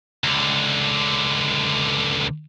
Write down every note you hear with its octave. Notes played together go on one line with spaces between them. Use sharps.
C#2 D3